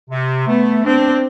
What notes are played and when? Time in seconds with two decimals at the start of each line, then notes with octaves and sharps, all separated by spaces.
0.10 C3
0.47 A3 B3
0.84 C4 D4